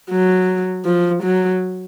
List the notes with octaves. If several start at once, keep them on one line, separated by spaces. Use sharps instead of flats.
F#3
F3
F#3